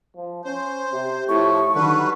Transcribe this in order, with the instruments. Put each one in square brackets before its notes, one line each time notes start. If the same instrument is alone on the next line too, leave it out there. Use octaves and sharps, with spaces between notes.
[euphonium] F3
[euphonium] C#4 [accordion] C5
[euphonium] C3 [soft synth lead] G4
[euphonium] A2 [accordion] F3 [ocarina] C#6
[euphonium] D3 [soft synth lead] D#3 [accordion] F#3 G3 B4